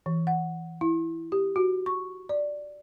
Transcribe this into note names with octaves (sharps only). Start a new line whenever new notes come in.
E3
F#5
E4
G4
F#4
C#6
D5